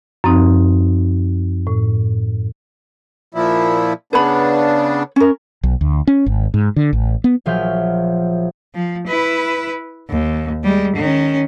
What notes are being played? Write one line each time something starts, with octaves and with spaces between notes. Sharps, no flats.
F#2 F3 C4 D#4
A2
A#2 F3 E4
C#3 B3 D4 B4 C#5 B5
C#4 A#4
B1
D2
C#4
G#1
G#2
D3
A1
B3
A#1 F3 F#3 E5 F6 G6
F3
E4 B4
D#2
G3 G#3
D#3 C#4